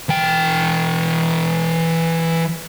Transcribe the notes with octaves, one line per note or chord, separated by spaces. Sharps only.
E3 G5